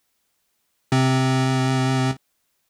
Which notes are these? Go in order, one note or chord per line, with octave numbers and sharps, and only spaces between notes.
C3 C4